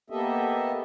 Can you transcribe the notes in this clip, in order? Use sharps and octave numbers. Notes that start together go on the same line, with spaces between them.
A#3 B3 G4 A4 D#5 E5